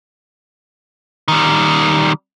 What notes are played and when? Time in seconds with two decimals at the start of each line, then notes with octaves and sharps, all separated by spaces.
1.28 D#3 G3